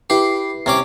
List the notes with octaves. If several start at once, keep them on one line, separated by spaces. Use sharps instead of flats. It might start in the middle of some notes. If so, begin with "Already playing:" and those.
E4 G4 B4 C7
C3 C#4 D6